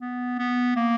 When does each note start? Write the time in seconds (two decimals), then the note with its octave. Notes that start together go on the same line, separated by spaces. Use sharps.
0.01 B3
0.39 B3
0.77 A#3